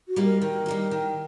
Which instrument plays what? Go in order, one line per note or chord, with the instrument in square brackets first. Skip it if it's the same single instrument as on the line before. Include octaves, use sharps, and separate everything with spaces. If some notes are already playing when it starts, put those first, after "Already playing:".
[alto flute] F#4
[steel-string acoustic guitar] G3 A#3 D#4
[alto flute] A#4
[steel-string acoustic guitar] D#3 [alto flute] A#4
[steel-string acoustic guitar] G3 A#3 D#4
D#3